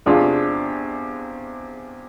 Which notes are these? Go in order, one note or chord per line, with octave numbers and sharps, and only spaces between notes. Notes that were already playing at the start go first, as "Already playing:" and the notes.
E2 C3 G#3 D4 F4